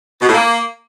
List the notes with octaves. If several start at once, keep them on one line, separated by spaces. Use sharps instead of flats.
B2
A2
A#3